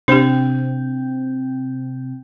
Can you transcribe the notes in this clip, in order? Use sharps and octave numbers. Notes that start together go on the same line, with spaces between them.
C3 C4 D4 G4